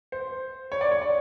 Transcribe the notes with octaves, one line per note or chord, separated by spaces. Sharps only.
C5
C#5
D5
C#5
D5